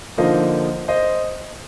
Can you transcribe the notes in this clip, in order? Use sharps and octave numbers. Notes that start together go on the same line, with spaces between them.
D3 F3 A#3 D#4 C5 D#5
C5 D#5